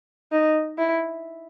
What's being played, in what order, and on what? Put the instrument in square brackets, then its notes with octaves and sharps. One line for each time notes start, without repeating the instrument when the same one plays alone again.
[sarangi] D#4
E4